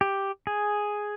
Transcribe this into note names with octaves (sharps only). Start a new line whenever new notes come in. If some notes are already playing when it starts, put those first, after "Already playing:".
G4
G#4